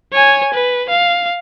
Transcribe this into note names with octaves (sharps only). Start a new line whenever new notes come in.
C#5 G#5
B4
F5